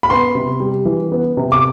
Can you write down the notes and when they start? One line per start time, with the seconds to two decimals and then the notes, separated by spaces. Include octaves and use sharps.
0.03 B5
0.10 B3 C6
0.35 C3
0.60 G3
0.85 E3
1.12 B3
1.37 C3
1.52 D6